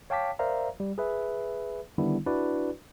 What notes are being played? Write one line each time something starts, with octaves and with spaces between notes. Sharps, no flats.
C#5 F5 G5 A5 D6 B6
A#4 C5 D5 E5 F5 A#5
G3
G#4 B4 E5
D3 D#3 G3 B3 D4 E4
D4 E4 F#4 B4 D5